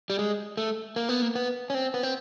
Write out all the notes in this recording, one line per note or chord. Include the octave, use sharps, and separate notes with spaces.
G3
G#3
A3
A#3
B3
A#3
B3
C#4
C4
B3
C4